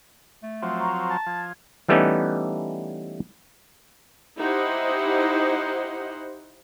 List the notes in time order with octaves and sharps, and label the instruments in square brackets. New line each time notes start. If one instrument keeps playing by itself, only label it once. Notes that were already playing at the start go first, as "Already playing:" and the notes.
[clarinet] A3
[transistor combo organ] F3 F#3 C4
[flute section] A#5 C#6
[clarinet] A5
[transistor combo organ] F3 [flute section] G#6
[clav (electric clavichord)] E3 G3 A3 B3 C#4 D#4
[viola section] D#4 E4 G4 C5 D#5 F#5